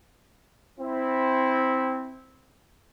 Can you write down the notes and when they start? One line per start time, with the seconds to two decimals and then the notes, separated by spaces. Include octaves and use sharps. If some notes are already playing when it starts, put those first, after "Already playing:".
0.80 C4 E4